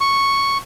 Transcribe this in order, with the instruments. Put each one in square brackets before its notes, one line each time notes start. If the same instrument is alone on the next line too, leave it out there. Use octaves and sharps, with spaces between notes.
[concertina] C#6